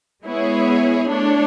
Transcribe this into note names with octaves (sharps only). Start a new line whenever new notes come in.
G#3 B3 E4 G#4 C#5
A3 D4 A4 C#5